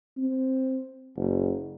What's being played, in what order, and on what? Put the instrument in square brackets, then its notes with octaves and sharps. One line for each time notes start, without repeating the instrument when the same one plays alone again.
[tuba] C4
F#1